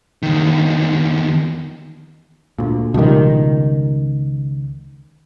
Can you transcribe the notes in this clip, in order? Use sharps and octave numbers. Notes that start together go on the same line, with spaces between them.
E2 D#3
D2 A#2
C#2 B2 D#3 F3 G3